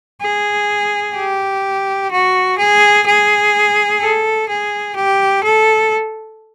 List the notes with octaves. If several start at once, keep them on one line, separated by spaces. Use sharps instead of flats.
G#4
G4
F#4
G#4
G#4
A4
G#4
G4
A4